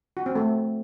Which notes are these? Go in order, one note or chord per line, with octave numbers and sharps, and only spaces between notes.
F#4
C4
A3